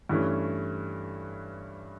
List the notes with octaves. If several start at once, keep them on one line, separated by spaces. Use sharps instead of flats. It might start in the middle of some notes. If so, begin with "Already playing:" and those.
G2 E3 A3 C#4